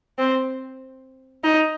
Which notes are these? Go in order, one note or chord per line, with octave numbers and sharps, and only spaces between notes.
C4
D#4